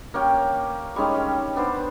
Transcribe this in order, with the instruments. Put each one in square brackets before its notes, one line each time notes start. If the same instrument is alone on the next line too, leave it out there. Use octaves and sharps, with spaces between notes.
[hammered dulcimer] A#3 C#4 G4 G5
G3 G#3 C#4 D#4
G4
B3 D4 C5